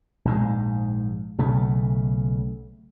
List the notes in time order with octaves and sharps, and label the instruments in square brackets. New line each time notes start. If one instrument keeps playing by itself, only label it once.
[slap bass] A#1 G#2 G#3
B1 C#3 A3